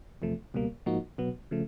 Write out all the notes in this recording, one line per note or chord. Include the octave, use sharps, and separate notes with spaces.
E2 C3 F3 A3
C#2 B2 G3 A#3
G#2 F3 A#3 D#4 F#4
B2 F#3 B3
C#3 F3 A3